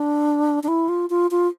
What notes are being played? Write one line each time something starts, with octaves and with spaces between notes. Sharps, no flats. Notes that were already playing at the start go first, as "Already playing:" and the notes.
Already playing: D4
D4
E4
F4
F4
F4